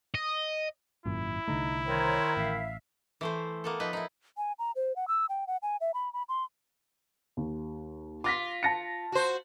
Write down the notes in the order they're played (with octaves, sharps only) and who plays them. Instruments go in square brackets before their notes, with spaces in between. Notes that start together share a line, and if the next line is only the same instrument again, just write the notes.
[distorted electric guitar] D#5
[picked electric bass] G#1 F#2 A#2 [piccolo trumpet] E4
[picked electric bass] C2 D3 A3 [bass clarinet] D#4
[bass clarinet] D#3 [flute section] C5 C#5 A#5
[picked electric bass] A1 [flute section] E5 F5
[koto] E3 A3 C5
A#3 B3 A4
F3 D#4 B4
D#4 E4
[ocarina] G#5
A#5
C5
F#5
E6
G5
F#5
G#5
E5
B5
B5
C6
[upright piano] D#2
[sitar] F4 [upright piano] D6 A#6 B6
[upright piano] A5 A#6 C#7
[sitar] F#4 C5